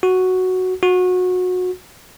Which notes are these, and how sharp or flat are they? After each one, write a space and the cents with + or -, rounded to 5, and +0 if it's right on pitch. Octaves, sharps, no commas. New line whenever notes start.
F#4 +0
F#4 -25